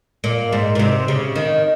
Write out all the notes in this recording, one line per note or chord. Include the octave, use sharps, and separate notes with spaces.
A#2
G#2
A#2
C3
C#3
D#3